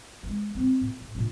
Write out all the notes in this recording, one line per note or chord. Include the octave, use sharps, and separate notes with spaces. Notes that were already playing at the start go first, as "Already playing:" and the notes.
E3 G#3
B3 C4
A#2
A1
A#2 D4